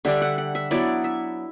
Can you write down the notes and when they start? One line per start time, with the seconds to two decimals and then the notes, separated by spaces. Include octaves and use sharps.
0.05 D3 G3 D4 E5
0.22 F#5
0.38 F#5
0.55 E5
0.71 F#3 B3 E4 D5
1.04 E5